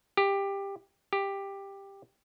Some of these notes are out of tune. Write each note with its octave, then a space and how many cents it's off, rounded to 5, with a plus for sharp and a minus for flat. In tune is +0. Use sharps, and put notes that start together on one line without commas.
G4 +15
G4 +10